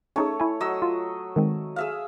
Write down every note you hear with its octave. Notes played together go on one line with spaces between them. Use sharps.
A3 C#4 D#4 G#4 C#5
E4 G#5
F#3 D#5 E6
F4
D#3 G#3 C4
G#4 E5 F5